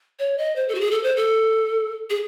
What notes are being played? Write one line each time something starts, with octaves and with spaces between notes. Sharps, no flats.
C#5
D#5
C5
A4
F#4
G#4
A4
C5
A4
G#4